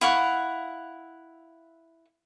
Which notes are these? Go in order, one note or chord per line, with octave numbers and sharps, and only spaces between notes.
E4 F5 F#5 C#6